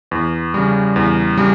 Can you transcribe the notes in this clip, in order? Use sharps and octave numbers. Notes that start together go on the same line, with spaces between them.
E2
C#3 G3
E2
C#3 G3